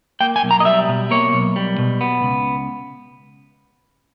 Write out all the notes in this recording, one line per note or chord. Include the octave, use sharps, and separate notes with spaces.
A#3 G5
G#5
B1
A#5
D#5
G3 E5
B2
A#3 C#5
B1
G3
B2
B3
C#2